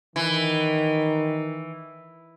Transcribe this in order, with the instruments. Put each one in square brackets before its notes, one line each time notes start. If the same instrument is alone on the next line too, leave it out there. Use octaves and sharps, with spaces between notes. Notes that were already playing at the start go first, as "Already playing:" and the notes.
[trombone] D#3 [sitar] E3